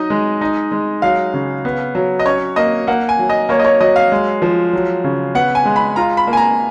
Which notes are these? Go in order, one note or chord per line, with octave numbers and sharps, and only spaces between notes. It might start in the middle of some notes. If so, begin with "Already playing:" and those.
Already playing: F#3 D#4 D#5
G#3
D#4
G#3
F#3 F5
C#3
B3
F#3
D#5
C#4 C#5
A#3 D#5
A#3 F#5
G#5
F#3
D#5
A#3 C#5
D#5
C#5
F#3 D#5
F5
G#3
F3
F#3
C#3
B3 F#5
G#5
G#3
B5
F4 A#5
B5
A#3
G#5
A#5